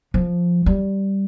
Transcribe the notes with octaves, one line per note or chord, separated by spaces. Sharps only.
F3
G3